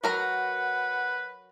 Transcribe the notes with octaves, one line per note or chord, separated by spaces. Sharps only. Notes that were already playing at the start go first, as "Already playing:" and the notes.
F#3 A#4 B4 F#5 A#5